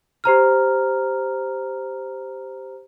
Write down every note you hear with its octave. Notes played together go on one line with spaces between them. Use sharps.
G4 C5 A#5 F6